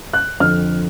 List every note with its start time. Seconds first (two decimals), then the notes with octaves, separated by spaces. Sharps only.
0.13 F#6
0.40 F2 D3 F6